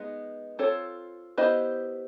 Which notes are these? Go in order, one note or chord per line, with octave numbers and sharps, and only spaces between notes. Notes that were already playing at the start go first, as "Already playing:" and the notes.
Already playing: G#3 B3 D#4
C4 F4 A4 C#5
B3 E4 G4 C5 D#5